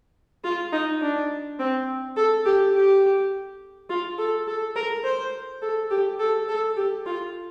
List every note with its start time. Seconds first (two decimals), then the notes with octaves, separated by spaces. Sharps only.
0.44 F4
0.73 D#4
1.02 D4
1.59 C4
2.17 A4
2.45 G4
2.74 G4
3.90 F4
4.18 A4
4.47 A4
4.76 A#4
5.04 C5
5.62 A4
5.91 G4
6.19 A4
6.49 A4
6.77 G4
7.06 F4